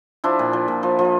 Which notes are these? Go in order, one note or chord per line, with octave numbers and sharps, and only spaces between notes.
F3 D4 E4
A#2
F3
A#2
F3
F3